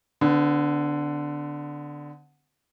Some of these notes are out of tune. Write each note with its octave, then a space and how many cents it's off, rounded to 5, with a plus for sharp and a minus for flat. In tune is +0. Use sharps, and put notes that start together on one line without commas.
D3 +0 B3 +40